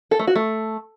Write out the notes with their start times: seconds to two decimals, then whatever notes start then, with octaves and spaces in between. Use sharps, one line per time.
0.11 A4
0.19 A3
0.27 F#4
0.35 A3